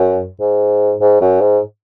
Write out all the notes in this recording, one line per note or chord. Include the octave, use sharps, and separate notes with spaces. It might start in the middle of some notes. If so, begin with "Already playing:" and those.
Already playing: F#2
G#2
G#2
F#2
G#2